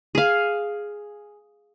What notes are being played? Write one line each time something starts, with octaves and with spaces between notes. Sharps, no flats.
G#4 F5